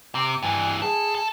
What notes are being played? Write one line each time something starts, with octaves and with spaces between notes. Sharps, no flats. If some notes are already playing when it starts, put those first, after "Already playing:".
C3 D6
G2 E3 G#5
G#4 A4
A4